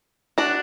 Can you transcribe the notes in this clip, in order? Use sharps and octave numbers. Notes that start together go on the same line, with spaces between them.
D4 F#4